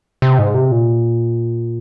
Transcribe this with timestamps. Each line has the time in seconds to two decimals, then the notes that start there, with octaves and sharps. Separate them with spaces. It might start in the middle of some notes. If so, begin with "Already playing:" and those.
0.22 C3
0.39 G#2
0.54 C3
0.72 A#2